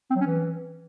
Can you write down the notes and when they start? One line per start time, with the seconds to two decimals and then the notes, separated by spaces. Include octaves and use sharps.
0.10 C4
0.16 F#3
0.21 C#4
0.26 E3